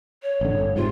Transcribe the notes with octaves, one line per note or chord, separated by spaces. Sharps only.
C#5
A1 D3
G1
G#2 C3 F4